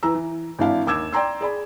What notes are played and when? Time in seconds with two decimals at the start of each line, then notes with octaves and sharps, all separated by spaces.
0.03 E3 B4 A#5 E6
0.15 E3
0.58 G#1 E3 D4 E4 F5
0.87 D#2 D6 E6 G#6 E7
1.13 D5 G5 A#5 C6 E6
1.41 G#4 D5 B5